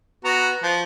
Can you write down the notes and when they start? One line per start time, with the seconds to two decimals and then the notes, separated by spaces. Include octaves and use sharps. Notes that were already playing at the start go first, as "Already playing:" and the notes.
0.25 B3 F#4 A#5
0.63 F3